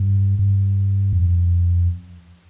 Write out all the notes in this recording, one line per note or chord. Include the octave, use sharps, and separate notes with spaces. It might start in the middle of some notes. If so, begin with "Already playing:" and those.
Already playing: G2
G2
F2